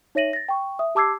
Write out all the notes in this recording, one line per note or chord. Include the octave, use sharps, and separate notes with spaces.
D#4 C#5 E5 A#6 D#7 F#7
A6 A#6
G5 C#6
E5 D#6
G4 A5 D6 E6 G#6 C7